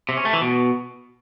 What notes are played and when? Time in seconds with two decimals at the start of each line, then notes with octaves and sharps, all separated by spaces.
0.09 C3
0.17 C#4
0.25 A3
0.33 E3
0.41 B2